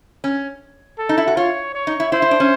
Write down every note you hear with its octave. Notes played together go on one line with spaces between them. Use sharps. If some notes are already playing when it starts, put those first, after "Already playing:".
C#4
A4
D#4
E4
F#4
F4 C#5
C#5
D#4
E4
E4 C5
E4
D4
C#4